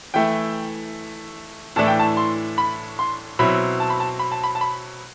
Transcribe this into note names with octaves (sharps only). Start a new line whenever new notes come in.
E3 A3 E4 G5
A2 E3 A3 D4 A5
G5
A5
C6
B5
C6
B2 F#3 C4 E4 B5
A5
B5
A5
B5
A5
B5
A5
B5